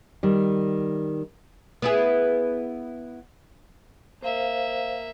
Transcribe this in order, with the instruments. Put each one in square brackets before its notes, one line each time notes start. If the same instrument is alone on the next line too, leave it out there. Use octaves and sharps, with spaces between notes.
[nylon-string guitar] D#3 G3
[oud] B3 E4 G#4
[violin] A#3 E5 [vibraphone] C5 F5